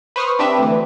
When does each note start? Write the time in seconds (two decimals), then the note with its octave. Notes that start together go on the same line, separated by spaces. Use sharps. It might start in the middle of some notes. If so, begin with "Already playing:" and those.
0.16 B4 C5 C#6 D#6 F6
0.39 C4 D4 G4 B4 E5
0.58 D2 E3